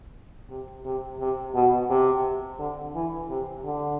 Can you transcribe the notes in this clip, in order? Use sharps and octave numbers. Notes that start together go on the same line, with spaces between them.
C3
C3
C3
B2
C3
D3
E3
C3
D3